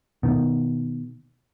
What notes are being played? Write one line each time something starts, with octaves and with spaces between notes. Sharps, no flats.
B2 D#3